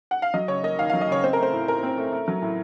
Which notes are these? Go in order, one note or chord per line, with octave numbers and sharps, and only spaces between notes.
F#5
F5
F#3 D#5
C#3 C#5
A#3 D#5
D#2 F5
F5
F#3
D#5
C#3 C#5
C4 C5
A#4
A3 C5
A2
A2 A#4
C4
A3
A3
F#3
A2